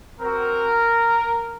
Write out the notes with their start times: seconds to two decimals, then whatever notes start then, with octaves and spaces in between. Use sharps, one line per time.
0.20 C4 F#4 A#4